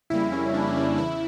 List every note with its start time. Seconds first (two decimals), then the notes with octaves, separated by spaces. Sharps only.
0.10 F2 C#3 G3 A#3 E4
0.32 C#4
0.54 D4
0.67 C#4
0.76 D4
0.98 E2 C#3 E3 E4